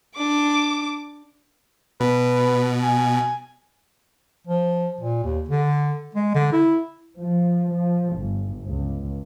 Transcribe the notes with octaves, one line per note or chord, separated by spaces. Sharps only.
D4 D6
B2 B4
G#5
F3
A#2
D#2
D3
G#3
D3
E4
F3
F3
G1
C#2